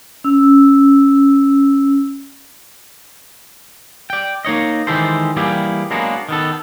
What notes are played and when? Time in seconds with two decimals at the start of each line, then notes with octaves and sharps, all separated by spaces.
0.24 C#4 E6
4.10 D5 G5
4.45 A#3 D#4 C#5 D#5
4.87 D#3 E3 G#3 G4 A4 C5
5.37 E3 G3 A#3 E4 G4 G#4
5.90 F#3 G#3 A#3 B3 D4 F#4
6.29 D#3 B3 A4